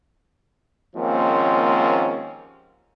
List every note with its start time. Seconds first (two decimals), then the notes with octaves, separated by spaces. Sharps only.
0.96 D#2 G#2 F3 A#3 C4 C#4